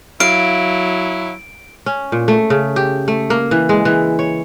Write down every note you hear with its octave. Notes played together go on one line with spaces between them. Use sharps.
F#3 E4 F5 D7
C#4
A#2
A3
C#3
G4
A3
A#3
E3
G#3
E3
C#5